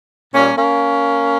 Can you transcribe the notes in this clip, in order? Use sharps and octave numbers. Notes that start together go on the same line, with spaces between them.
A#2 G3 A#3 C#4
A#3 C#4